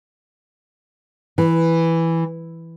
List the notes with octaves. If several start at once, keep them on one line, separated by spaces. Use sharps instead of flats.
E3